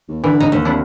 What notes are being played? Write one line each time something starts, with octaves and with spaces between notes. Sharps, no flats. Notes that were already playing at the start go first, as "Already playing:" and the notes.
D#2
D3 E3
D#4 A#5
D#2
C3 D4 E4 F#5